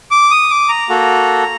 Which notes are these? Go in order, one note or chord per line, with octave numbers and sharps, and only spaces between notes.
D6
D#6
D6
A#5
A#3 F#4 A4